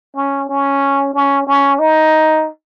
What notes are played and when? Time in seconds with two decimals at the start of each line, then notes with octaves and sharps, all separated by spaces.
0.16 C#4
0.49 C#4
1.14 C#4
1.47 C#4
1.79 D#4